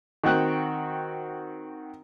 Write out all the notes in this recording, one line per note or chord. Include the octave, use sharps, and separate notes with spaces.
D#3 C4 F#4 G5 F#6